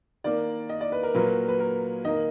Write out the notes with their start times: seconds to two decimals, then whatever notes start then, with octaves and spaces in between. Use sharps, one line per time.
0.24 D#3 A#3 D5
0.69 D#5
0.81 D5
0.92 B4
1.03 A#4
1.15 A#2 F#3 A#3 B4
1.48 B4
1.59 A#4
2.05 D#3 A#3 D#5